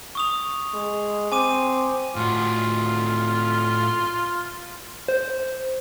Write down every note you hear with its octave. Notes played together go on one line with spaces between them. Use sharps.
C#6 D#6 F7
G#3
C4 G#5 D6 D#7
A2 F4 F#4
C5